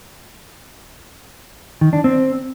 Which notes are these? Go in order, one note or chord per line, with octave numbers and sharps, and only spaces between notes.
D#3
D4
C4